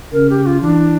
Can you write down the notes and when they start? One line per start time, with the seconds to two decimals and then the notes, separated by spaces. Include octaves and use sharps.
0.12 C#3 A#4
0.30 G4
0.46 F4
0.61 E3 D4